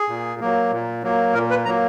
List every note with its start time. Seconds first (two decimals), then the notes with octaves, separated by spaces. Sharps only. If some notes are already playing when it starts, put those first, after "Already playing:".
Already playing: G#4
0.09 A#2
0.40 F#3 A#3
0.71 A#2
1.03 F#3 A#3
1.34 A#2 A#4
1.50 B4
1.65 F#3 A#3 A#5